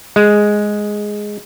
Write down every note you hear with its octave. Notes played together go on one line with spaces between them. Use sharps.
G#3